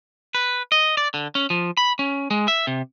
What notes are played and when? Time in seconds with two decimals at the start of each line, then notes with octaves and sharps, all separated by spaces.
0.35 B4
0.72 D#5
0.97 D5
1.14 D3
1.35 C#4
1.50 F3
1.77 B5
1.99 C#4
2.31 G#3
2.48 E5
2.67 C3